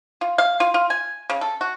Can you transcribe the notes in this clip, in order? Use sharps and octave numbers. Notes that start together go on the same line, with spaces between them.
F4
F5
F4
F4
G#5
C#3
A4
F#4